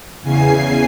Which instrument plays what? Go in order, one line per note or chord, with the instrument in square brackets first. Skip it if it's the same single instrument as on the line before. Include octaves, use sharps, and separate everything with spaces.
[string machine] E2 C#3 G#5 C7